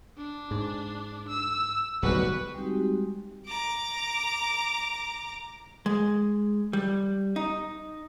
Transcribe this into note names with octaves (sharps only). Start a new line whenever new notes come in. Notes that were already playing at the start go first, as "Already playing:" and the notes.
D4
G#2
E6
D1 B1 G3 F#4 B4
G3 G#3 C4 D#4 F#4 G4
A#5 D6
G#3
G3
D#4